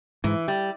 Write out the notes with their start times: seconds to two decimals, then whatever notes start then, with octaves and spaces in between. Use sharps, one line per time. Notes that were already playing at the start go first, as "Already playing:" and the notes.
0.24 G#2 E3
0.48 G3